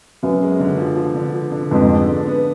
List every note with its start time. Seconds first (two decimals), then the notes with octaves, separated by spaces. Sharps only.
0.23 F#2 B3
0.42 G#3
0.60 D3
0.78 F3
0.96 F3
1.15 D3
1.34 F3
1.52 D3
1.71 F2 G#2 B3
1.89 G#3
2.07 D4
2.26 B3